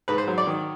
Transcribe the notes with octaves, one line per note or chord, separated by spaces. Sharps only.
G#2 B4
C5
F#3
D5
D#3